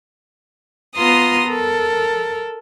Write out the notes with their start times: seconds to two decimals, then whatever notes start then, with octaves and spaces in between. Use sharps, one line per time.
0.95 B3 F4 A#5 C6 D#6
1.48 A4 A#4